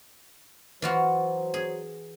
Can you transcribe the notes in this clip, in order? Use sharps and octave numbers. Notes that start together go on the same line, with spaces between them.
E3 F#3 F4 F#4 C5
G#4